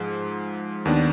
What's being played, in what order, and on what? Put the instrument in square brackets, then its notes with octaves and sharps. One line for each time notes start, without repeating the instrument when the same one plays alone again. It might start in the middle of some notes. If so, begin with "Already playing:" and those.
Already playing: [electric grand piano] G#2 F3 G#3
D#2 D#3 B3 D4